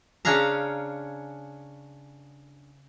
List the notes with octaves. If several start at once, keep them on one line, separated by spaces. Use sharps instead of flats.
C#3 C#4 D4 F5 A#5